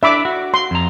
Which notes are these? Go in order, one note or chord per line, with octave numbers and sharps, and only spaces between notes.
D4 D5 E5 B5 D6
F#4
C6
F2 A#5